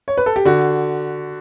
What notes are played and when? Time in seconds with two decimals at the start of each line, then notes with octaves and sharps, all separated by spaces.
0.08 C#5
0.17 B4
0.26 A4
0.36 G4
0.45 D3 F#4